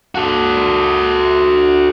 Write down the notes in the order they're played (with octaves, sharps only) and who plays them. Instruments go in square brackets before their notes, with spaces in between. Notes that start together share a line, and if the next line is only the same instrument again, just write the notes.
[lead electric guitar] F#4 A4